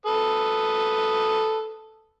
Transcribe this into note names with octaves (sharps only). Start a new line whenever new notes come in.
A4 B4 D#6